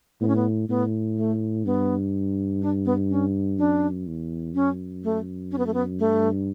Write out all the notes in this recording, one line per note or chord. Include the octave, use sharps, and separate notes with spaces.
A2 B3
C#4
B3
A2 B3
A3
G2 B3
D4
B3
C#4
F#2 D4
E2
F#2 C#4
A3
C#4
B3
A3
B3
G2 A3